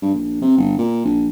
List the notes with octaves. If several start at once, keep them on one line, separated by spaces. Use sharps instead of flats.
G2
A#1
C3
G1
A#2
A#1